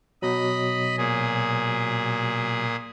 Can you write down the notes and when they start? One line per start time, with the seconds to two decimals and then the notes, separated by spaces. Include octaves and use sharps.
0.22 B2 F#3 D#5 B5
0.98 A#2 G#4